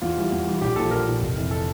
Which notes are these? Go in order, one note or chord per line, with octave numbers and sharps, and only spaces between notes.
E2 F4
E3 G3
E2
E3 G3
A#1 G4
A#2 F3 A4
A#1 A#4
A#2 F3
F1
F2 E3
A4